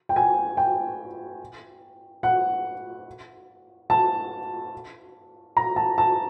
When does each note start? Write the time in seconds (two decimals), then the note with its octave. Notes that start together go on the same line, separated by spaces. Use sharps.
0.09 G5
0.16 G#5
0.57 G5
2.23 F#5
3.90 A5
5.57 A#5
5.76 A5
5.98 A5